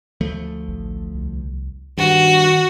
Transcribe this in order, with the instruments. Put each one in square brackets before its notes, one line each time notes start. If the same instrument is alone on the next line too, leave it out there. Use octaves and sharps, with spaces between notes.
[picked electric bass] D2 F3 A3
[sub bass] A1
C2
[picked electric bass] G2 [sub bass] D#3 [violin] F#4